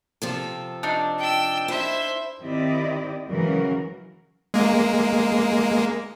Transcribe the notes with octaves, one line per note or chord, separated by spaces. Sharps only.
C3 F3 A4
D4 D#4
G5 E6
E4 C5 E5
D#3 C4 E4 G4 D5 D#5
C#3 E3 F#3 G#3 F#4 A#4
G#3 A#3